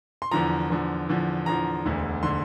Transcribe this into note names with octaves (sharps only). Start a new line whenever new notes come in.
C6
E2 D3 F3 A#5
E2 D3 F3
E2 D3 F3
E2 D3 F3 A#5
E1 D2 D3
D3 C6